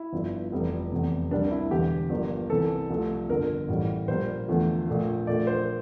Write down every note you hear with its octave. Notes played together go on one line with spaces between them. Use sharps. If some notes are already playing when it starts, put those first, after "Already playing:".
Already playing: E4
G1 G2 F3
F1 F2 E3 G3
F1 E2 C3
C2 C3 G3 A#3 D4
E4
E1 E2 D3 G4
G1 G2 F3 A#3
C2 C3 E3 A#3 A4
C2 C3 F3 A3
G1 F2 D3 A#4
A1 A2 G3
A#1 A#2 G3 A#3 C5
E2 D3 F3 A3
A#1 A#2 A3
A#1 A#2 A3 D5
C5